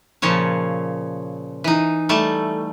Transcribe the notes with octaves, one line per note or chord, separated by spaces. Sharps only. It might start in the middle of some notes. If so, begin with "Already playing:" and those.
A#2 C#3 F3 C#5 A5
E3 D#4
G3 A3 A5